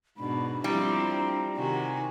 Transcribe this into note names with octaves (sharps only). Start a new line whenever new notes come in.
G#2 B2 D4 B5
F3 G3 C4 E4 A#5
C3 D#3 F#4 G#5